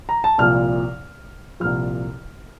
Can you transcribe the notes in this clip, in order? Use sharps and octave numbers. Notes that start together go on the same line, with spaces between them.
A#5
A5
C2 A#2 F3 F6
C2 A#2 F3 F6